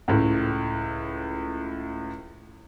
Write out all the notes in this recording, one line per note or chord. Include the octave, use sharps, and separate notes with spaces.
C#2 A2